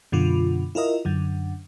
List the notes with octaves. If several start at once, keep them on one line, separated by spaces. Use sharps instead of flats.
F#2 B2 D3 F4
E4 F4 A#4 D#5 E5
F#2 D3